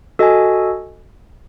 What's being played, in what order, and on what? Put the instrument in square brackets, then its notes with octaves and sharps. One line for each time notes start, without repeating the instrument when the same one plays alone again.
[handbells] F#4 A4 D#5 G#5